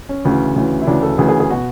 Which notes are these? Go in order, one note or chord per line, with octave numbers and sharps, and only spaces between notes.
C#4
D2 C#3 E3
D2 C#3 E3
E4
D2 C#3 E3 D4
A4
D2 C#3 E3 G#4
G#4
G#4
B2 F#4